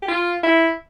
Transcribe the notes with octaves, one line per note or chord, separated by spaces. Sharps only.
G4
F4
E4